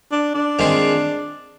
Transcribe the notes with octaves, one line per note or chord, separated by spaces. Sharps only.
D4
D4
D#3 G#3 C4 F4